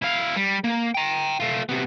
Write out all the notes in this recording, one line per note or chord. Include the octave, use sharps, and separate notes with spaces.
E4 F5
G3
A#3
G5 A#5
A3 F4
C3 B3